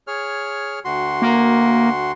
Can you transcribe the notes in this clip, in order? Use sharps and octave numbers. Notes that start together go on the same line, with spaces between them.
G#4 C#5 F6
D2 F#4 C6
A#3